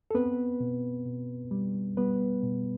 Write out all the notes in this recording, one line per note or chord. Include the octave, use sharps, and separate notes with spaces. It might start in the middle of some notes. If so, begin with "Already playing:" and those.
A4
B3 C4 B4
B2
B2
G3
G3 B3 B4
B2